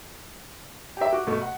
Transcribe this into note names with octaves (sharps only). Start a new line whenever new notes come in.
G4 E5
F#4 D6
B2 A3
F#5